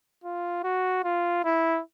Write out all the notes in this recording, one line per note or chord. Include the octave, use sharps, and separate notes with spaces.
F4
F#4
F4
E4